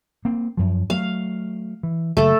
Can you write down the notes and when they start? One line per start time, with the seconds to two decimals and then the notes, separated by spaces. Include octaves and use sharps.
0.25 A#3 C4
0.57 F#2 F3
0.90 F#3 A3 F5
1.83 E3
2.17 F#1 F#2 A3 A4